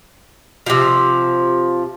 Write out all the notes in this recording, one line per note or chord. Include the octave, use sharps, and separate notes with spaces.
C3 F3